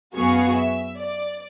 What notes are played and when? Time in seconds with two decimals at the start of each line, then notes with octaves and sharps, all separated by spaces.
0.15 F#2 B3 F#4 G#4 F5 C#6
0.55 E5
0.98 D5